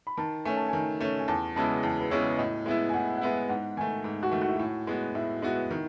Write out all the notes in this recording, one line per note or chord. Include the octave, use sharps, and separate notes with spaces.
B5
D#3 A5
A3 C#4 G#5
A5
D#3 G#5
A3 C#4
G#5
E2 A5
C#3 G#3 B3 E4 A5
E2 A5
B4
C#3 G#3 B3 E4 C#5
A2 D#5
G#3 B3 E4 E5
G#5
A2 F#5
F#5
G#3 B3 E4 E5
G#2 F#5
D#3 A3 G#5
G#2
F#4
D#3 A3
F#4
E4
A2 F#4
G#3 B3 F#4
A2 E4
G#3 B3 E4 F#4
D#3